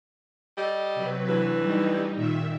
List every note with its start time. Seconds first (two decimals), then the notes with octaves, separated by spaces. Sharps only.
0.57 G3 A4 D#5
0.95 C3 F#3 B4
1.28 D2 E3
1.61 G3 D#4
2.16 A#2 D#3 E5